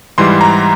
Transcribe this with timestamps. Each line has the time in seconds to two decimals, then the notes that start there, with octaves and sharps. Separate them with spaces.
0.18 G#2 E3 G3 C6
0.41 A#5